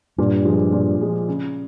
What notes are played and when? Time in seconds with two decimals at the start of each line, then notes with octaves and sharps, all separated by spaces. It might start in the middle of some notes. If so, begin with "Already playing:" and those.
0.18 G2 A#2
0.45 F3 G#3
0.72 A#2
1.01 F3 G#3
1.28 C#3